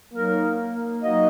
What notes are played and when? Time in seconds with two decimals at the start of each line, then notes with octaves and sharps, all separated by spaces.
0.13 F#3 A#3 D#4 A#4
1.02 F#3 D#4 F#4 D#5